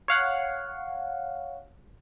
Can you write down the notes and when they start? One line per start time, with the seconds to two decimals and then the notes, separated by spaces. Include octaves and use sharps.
0.08 C#5 F5 F#5